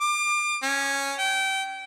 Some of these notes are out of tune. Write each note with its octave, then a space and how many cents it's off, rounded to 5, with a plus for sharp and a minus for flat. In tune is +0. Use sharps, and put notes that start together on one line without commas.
D6 +35
C#4 -5
G5 -25